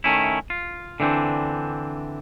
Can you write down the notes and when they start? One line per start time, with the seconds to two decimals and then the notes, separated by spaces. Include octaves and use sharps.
0.04 D#3 A3 C#4 E4
0.50 F4
1.00 D3 E3 B3 C4 D4